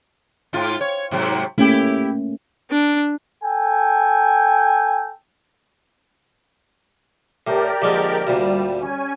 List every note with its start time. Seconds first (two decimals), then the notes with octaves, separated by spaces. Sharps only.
0.53 G#2 F4
0.81 C#5
1.11 G#2 C3 F#3
1.58 A3 A#3 C#4 E4 G4
2.71 D4
3.44 A4 G5 G#5
7.47 A2 G4 A#4 D5
7.82 A#1 D3 G#3
8.27 D2 A#2 G3
8.81 C#4 G#5